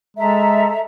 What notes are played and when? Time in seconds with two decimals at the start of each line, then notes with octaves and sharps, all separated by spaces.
0.17 G#3 A4 E5 A#5